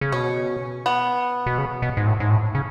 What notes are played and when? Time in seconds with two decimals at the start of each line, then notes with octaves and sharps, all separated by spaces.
0.01 C#3
0.12 B2 C#4
0.86 B3
1.46 B2
1.58 C#3
1.82 B2
1.97 G#2
2.07 A2
2.20 G#2
2.30 A2
2.55 C#3